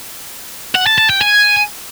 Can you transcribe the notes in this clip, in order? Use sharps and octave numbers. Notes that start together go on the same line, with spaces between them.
F#5
A5
A5
G5
G#5